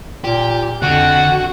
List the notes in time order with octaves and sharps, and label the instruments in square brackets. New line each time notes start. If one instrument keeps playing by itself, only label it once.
[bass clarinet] A#2 [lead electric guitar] G4
[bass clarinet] F2 [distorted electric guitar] D3 [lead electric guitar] F#4 [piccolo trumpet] F#5